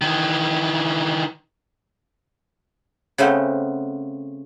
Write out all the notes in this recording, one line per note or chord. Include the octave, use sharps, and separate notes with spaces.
D#3 E3
C#3 A3 B3 C4